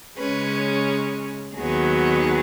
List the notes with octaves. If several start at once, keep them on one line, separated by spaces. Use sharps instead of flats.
C#3 G#3 C#4 B4
D#2 D#3 F#3 B3 G#4